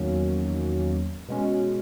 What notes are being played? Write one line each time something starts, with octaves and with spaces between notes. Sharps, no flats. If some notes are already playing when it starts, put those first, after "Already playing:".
Already playing: E2 D#3 F#3 A#3 C#4
B2 G#3 C#4